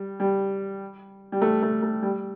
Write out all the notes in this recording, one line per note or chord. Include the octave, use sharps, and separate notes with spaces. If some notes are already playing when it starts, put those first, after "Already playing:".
Already playing: G3
G3
G3
A3
A3
A3
G3